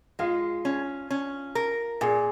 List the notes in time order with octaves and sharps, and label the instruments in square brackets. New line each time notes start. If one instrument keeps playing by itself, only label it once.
[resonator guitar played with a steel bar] G#3 [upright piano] F4
[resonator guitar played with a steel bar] C#4
C#4
A#4
[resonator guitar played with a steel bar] A#2 [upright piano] G#4